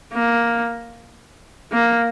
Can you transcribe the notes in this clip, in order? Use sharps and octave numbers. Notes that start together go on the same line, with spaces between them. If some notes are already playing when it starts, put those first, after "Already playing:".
A#3
A#3